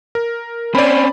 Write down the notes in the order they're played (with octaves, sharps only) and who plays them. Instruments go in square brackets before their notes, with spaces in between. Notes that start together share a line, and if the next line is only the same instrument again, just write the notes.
[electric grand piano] A#4
[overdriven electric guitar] C4 C#4 [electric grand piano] D5 B5